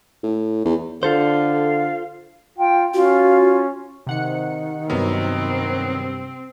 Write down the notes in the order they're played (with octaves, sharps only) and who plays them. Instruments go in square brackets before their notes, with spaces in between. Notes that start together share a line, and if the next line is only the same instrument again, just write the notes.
[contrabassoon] A2
E2
[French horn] D3 [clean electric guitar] F4 A4 C5 [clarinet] F5
[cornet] F4 [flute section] G5
[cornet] C#4 [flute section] F4 [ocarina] F#4
[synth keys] C3 F#5 C#7 [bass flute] D#3
[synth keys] G2 C3 [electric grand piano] F#3 B3 A#4 [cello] C4